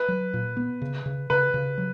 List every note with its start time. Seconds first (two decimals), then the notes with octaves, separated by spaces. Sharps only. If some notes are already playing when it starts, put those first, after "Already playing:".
Already playing: B4
0.08 F#3
0.34 A#2
0.57 B3
0.82 C#3
1.06 C#3
1.30 C#3 B4
1.54 C#3
1.78 F#3